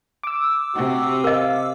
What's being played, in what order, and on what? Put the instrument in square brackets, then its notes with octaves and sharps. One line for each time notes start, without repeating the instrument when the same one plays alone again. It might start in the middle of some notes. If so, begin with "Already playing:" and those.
[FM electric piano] D6 E6
[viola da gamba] C3 [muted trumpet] F#4
[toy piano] A#4 D#5 [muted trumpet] F5